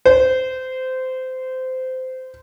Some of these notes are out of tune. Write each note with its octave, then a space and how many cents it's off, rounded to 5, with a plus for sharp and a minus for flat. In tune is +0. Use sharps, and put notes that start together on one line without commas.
C5 -20